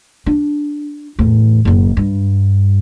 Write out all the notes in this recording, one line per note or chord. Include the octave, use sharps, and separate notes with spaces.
D4
E2 A2
F#1 F#2
G2